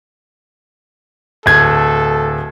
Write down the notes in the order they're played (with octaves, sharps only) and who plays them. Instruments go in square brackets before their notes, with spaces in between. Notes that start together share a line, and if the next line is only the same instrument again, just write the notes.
[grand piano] D1 G#6 [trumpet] A4